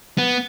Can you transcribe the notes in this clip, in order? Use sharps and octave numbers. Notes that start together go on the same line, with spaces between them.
B3